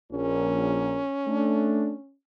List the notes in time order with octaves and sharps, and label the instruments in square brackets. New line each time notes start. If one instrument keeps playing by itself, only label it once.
[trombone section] A#1 A#4 [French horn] C#4
[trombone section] A3 D4